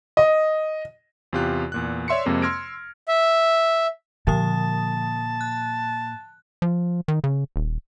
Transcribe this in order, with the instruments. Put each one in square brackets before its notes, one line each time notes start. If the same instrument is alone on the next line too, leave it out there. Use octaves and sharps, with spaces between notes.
[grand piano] D#5
[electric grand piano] E2 C3 F4 G4 F#6
E2 A#2 F#6
C#5 D5 E5 C6 C7 C#7
F2 C3 G#3 A#3 C4
C6 E6 F6 G#6 A#6 D7
[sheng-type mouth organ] E5
[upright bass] A#2 [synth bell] D3 F3 D#6 [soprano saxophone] A5
[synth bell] F#6
[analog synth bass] F3
D#3
C#3
D#1